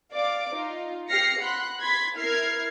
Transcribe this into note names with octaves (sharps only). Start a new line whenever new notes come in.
D5 F5 D6
D#4 F4
G4 F6 A#6 C7 C#7
F#5 B5 C6 F#6
B5 C6 G#6 A6 B6
E4 A#4 F6 G#6 C7